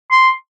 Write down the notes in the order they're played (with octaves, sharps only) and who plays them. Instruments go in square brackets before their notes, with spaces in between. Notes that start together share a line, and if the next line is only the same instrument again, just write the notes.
[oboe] C6